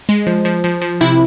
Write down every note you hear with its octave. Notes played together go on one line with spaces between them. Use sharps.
G#3
F3
F3
F3
F3
C3 E4